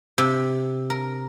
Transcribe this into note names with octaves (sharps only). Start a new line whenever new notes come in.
C3
A#4